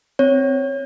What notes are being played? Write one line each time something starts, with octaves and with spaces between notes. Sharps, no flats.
C4 C#5